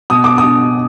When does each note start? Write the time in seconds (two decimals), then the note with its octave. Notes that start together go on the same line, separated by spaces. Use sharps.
0.10 B2 D#6
0.24 D6
0.38 D#6
0.44 B2